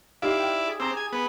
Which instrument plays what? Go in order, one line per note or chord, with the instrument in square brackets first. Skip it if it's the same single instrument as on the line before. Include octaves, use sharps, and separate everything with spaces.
[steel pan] D#4 G4 F5 [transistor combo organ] E4 D5
[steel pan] F5 G5
[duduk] G#4
[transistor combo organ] C4 [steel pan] A#5 D6 E6
[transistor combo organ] G#5
B3